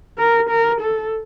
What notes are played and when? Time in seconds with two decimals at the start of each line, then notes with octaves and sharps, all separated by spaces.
0.18 A#4
0.50 A#4
0.81 A4